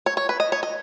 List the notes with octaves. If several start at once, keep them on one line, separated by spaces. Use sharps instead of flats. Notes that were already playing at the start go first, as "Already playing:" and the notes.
C#5
C#5
B4
D#5
C#5
D#5